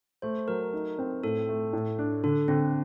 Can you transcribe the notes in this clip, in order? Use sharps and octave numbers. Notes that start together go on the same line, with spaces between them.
A3 C5
F#3 A#4
D#4
C4
A2 A4
A3
A2
D4
D3 A4
D3 C4